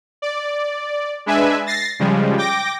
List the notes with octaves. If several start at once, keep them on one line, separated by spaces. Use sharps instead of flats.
D5
G#3 D4 B4 E5 G#5
A6 A#6 C7
C#3 F3 G3 G#3
G5 D6 A#6